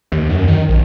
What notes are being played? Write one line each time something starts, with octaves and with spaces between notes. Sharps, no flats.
D#2
F#2
D#3
A#1